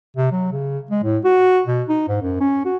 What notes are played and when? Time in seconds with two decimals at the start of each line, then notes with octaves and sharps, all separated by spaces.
0.16 C3
0.32 F#3
0.52 C#3
0.91 G#3
1.03 A2
1.24 F#4
1.67 B2
1.89 D#4
2.09 G#2
2.22 F#2
2.40 C#4
2.65 F#4